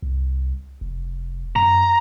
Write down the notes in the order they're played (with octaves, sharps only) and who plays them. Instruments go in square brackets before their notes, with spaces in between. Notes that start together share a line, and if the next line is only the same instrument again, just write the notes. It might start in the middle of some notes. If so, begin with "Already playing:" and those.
[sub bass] C2
F1
[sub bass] F#2 [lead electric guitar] A#5